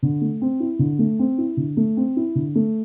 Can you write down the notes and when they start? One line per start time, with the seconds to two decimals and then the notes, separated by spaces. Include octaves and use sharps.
0.03 D3
0.21 A3
0.41 C4
0.60 E4
0.79 D3
0.99 A3
1.19 C4
1.38 E4
1.57 D3
1.77 A3
1.97 C4
2.17 E4
2.35 D3
2.55 A3